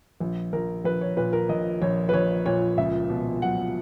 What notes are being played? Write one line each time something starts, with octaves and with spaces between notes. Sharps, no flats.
A#1
A#1 A#4
A#1 B4
C#5
A#2 B4
A#4
A#1 D#5
A#1 C#5
B4
A#1 C#5
A#2 C#5
C#2 E5
B2
F#3 F#5